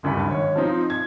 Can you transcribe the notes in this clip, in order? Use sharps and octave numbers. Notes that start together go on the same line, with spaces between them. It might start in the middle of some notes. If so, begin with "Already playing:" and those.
F#1 D2 G2 B5
G#1 C#5
F3 C4 D#4
G#6